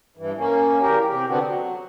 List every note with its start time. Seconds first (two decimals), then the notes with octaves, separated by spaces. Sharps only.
0.17 G2 E3
0.37 A#3 C#4
0.81 E2 G4 A#4
1.10 C3 G4
1.29 D3 B3 C4 D4 F#4
1.43 F#3